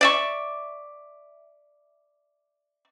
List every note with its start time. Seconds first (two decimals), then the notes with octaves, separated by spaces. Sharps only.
0.01 D5 E5 C#6